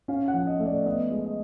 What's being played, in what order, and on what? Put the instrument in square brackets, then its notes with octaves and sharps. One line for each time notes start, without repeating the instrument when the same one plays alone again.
[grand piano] C#4 F5
F#5
F3
D#5
A3
D5
B3 D#5
G#3
D#5